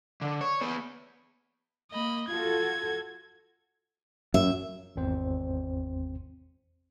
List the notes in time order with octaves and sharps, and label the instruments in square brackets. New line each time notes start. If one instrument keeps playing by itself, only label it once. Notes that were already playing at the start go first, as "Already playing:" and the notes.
[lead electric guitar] D3
C#5
B3 G#4
[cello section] A#3 [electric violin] D#5 B5
[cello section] F4 F#4 A4 [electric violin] G#6
[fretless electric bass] F#2 [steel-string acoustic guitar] E5
[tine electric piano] G#1 E2 C4 C5